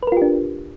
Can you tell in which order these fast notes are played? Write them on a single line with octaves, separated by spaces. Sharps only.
B4 A#4 F4 G4 D4